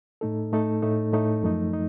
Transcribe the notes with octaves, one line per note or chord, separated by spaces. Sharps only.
A2 A3 D#4 A4
A2 A3 D#4 A4
A2 A3 D#4 A4
A2 A3 D#4 A4
F#2 F3 A3 D#4
D#4